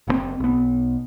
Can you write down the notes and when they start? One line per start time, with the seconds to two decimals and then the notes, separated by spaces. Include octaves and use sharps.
0.07 F#1 C#3 C4
0.40 B1 B3